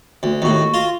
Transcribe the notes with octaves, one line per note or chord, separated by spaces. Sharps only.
D2
D#2 A2 F#4
F4